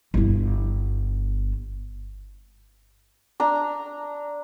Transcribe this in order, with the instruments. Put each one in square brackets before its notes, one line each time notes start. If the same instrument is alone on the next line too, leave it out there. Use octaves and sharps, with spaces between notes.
[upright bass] G1 E4
[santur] D4 A#5